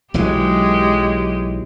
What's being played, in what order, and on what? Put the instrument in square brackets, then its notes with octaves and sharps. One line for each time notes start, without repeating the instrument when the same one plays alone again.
[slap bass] B1 E3 F#3 [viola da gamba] G#3 G4